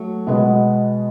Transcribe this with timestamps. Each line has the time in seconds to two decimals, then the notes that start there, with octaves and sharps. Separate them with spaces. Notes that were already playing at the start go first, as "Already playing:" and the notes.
Already playing: F#3 A3
0.27 B2 G#3 B3